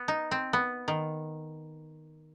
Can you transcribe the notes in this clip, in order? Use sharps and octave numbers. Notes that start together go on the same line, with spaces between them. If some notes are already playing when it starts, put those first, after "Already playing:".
Already playing: B3
D#4
C4
B3
D#3